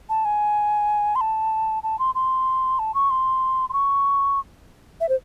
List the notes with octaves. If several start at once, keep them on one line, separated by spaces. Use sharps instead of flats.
A5
G#5
C6
A5
A5
C6
C6
A5
C#6
C6
C6
C#6
E5
C5